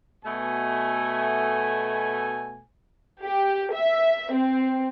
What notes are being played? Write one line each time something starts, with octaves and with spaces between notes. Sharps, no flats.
B2 A3 G#5
G4
E5
C4